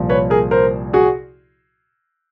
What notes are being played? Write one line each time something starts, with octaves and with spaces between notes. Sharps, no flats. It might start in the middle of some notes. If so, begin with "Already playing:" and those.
Already playing: C2 A#2 F3
B4 C#5
G#4 A#4
A#4 C5
F#4 G#4